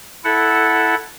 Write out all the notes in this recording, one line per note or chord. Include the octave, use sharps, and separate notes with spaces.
E4 A4 F#5